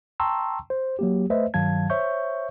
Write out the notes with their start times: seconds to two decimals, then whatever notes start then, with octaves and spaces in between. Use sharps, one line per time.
0.20 G5 A5 A#5 C6 C#6 E6
0.70 C5
0.99 F#3 A#3 G4
1.30 A3 B4 C5 D#5 E5
1.54 G2 D#3 F#3 F5 A5 G#6
1.90 C5 C#5 E5 C#6 G6